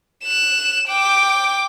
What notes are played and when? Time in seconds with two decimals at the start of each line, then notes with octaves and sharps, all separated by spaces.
0.24 F#6 E7
0.88 G5 D6